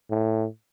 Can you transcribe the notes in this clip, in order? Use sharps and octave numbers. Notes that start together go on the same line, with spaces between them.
A2